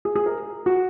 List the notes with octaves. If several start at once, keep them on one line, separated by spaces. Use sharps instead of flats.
G#4
G#4
A#4
F#4